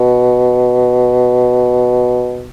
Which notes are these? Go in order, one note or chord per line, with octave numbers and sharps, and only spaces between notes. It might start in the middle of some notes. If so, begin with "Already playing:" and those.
Already playing: B2